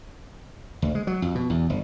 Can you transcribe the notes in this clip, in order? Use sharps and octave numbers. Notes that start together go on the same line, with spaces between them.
D2
G#3
F#3
F2
B2
E2
G1